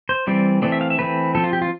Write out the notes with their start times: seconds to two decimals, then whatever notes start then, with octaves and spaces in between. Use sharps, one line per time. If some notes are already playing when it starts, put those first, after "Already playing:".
0.09 C5
0.27 E3 G3 C4 D5
0.62 E3 A3 C4 D5
0.72 E5
0.81 F5
0.90 E5
0.99 E3 A3 C4 B4
1.35 F3 C4 A4
1.44 F4
1.53 G4
1.62 F4